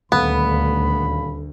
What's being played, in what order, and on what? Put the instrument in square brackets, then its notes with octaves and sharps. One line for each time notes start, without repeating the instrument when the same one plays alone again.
[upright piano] D#1 F5 [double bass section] D2 [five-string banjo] B3 [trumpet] B5